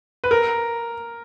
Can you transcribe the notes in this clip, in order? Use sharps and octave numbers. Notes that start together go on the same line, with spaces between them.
B4
A#4